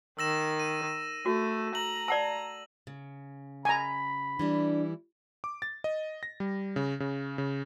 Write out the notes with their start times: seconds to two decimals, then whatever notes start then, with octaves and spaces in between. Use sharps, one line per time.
0.19 D#3 E6 A#6 E7
0.60 D#7
1.26 A3 F#4
1.75 A#5 F#7
2.08 D5 F#5 A5
2.87 C#3
3.65 G#5 A#5 B5
4.39 E3 G3 D4 E4
5.44 D6
5.62 A6
5.84 D#5
6.23 A#6
6.40 G3
6.76 C#3
7.00 C#3
7.38 C#3